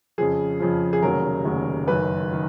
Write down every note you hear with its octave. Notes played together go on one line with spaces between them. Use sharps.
F2 C#3 F3 G#4
F2 C#3 F3
G#4
F1 D#2 C#3 F#3 A#4
F1 D#2 C#3 F#3
F#1 F#2 D#3 B4
D#3